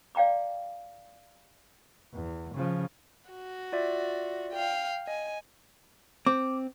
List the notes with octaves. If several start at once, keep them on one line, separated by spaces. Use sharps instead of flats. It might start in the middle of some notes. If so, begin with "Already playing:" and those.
D5 F5 G5 A#5 D6
E2
C#3 F3
F#4
F4 D5 E5
F5 G5
D#5 G#5
C4 D6